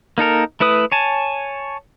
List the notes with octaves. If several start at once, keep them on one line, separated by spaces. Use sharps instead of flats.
A#3 D#4 A4 A#4
A3 E4 B4 D#6
C#5 G#5 A5